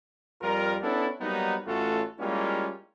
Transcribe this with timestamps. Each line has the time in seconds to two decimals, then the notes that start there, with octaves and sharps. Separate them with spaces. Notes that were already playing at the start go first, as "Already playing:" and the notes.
0.42 F2 G3 F4 A#4
0.83 B3 C#4 D4 E4 A4
1.21 F#3 G3 A#3 B3 D#4
1.67 A1 A3 C#4 F4 F#4 A4
2.20 G3 G#3 A#3 C#4 E4 F4